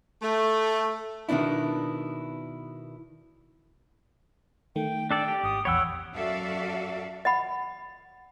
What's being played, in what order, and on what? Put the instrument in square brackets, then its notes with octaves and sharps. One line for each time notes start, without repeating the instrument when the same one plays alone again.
[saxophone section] A3
[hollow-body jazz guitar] B2 D#3 B3 D4 E4
[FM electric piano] D#3 A3 [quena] G5
[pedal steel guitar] D4 A4 D5 [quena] G5
[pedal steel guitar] G4
[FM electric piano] G#1 [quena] D#6
[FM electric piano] A#1 E2 B5 [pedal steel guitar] C#5 G5 E6 [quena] F#5
[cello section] F#2 F#4 A4 D5 E5 F5
[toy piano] D#5 F#5 B5